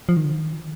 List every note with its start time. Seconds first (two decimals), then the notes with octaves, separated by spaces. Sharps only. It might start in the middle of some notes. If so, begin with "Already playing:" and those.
0.09 F3
0.17 D#3
0.25 D3
0.32 D#3